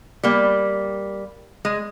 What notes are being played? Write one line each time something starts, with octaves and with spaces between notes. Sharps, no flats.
G3 A#3
G#3